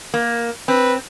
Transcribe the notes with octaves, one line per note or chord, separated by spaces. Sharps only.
A#3
C4 B4